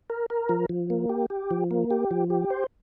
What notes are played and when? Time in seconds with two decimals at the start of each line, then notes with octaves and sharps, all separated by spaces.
0.10 A#4
0.30 A#4
0.49 F3
0.69 F3
0.90 A#3
1.09 G4
1.30 G4
1.51 F3
1.71 A#3
1.91 G4
2.11 F3
2.30 G4
2.50 C5